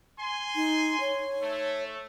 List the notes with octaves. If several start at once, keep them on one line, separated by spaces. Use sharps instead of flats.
G#5 C6
D#4
C#5
A3